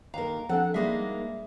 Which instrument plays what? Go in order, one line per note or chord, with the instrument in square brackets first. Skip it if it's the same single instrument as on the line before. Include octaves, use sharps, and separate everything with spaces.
[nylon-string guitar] D#2 A#4 [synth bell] F5 A#5
[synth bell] F3 C4 D4 [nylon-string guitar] A4 F#5
[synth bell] G3 G#4 E5 [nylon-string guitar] G#3 A#3 D#4